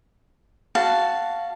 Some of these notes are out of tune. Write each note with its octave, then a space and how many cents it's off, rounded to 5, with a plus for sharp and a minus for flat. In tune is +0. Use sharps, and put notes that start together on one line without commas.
F#4 +0 F5 -15 A5 +0